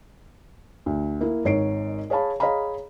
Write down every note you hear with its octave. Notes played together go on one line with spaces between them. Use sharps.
D2
A#3 E4
G#1 G#2 C#5 C7 D7
G#4 C#5 F5 A5 B5
G#4 C#5 D#5 F5 A#5 B5